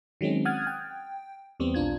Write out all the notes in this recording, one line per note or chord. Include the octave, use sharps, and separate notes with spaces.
D#3 F#3 G#3 C4 C#4
F#5 D#6 F6 F#6 G#6 A6
G5
E2 G3 B3 C4
B1 D4 F4 G#6